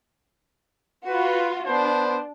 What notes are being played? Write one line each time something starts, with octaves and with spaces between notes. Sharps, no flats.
F4 F#4 B4
B3 D4 C5